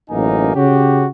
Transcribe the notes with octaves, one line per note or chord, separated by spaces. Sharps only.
A1 F#2 A#3 D#4 G#5
C#3 C#4 F#4 G4